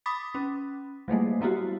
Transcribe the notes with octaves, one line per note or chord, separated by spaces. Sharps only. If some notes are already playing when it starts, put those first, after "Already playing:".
B5 D6 D#6 A6 B6
C#4
F#3 G3 A3 A#3
G3 B3 E4 F#4 G4